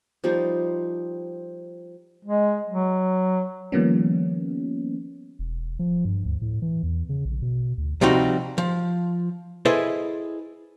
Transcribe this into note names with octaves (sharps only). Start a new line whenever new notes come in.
F3 G3 D#4 C5
G#3
F#3
D#3 F3 G3 A#3 B3 C#4
E1
F3
G2
D2
A2
E3
E2
C#3
A#1
B2
D2
C3 F3 G3 C4 D#4 F#4
F3
E4 G#4 A4 B4 C5 D#5